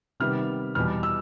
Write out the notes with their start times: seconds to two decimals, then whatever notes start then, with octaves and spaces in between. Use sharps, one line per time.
0.20 C3 D#3 G3 B3 F6
0.75 E2 B2 G3 F6
1.03 E6